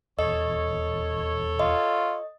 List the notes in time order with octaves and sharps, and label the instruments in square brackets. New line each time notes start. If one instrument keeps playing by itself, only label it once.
[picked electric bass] D#1 E2 [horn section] A4 C#5 [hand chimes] D#5
[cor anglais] F4 [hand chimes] D#5